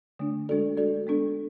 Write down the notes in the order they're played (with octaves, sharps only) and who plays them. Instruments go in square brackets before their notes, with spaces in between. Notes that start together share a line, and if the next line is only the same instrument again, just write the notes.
[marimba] D3 A3 D4
G#3 D4 F#4 A4 D5
G#3 D4 F#4 A4 D5
G#3 B3 D4 A4